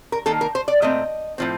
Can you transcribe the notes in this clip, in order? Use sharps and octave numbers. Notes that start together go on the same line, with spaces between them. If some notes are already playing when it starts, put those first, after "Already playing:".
A#4
D#3 A#3 A4
A#4
C5
D5
A#2 A3 C4 D#5
A2 F3 C4